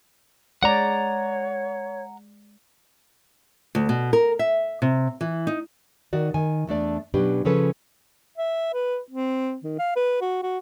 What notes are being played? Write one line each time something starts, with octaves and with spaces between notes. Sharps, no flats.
G#3 C#5 D5 F#5 A#5
D2
B2
A#4
E5
C3
E3
D#4
D#3 D#4 F#4 D5
D#3 G#5
E2 A3 D4 D5
B2 F#3 C#4 D4 G4 B4
C#3 F3 C#4 G#4 A4 B4
E5
B4
C4
D#3
F5
B4
F#4
F#4